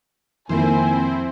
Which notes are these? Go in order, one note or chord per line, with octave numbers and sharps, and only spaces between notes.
F2 D#3 A#3 C4 E4 C5 G#5